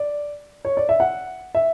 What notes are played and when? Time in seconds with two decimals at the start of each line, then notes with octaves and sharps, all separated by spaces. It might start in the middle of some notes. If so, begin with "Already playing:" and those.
Already playing: D5
0.65 C#5
0.77 D5
0.89 E5
1.00 F#5
1.55 E5